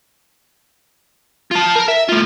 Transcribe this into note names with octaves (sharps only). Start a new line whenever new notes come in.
F4 A5
A#4
E5
A2 F4